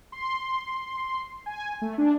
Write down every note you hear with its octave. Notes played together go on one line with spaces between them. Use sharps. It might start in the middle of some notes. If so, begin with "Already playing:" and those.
C6
G#5
A3
D4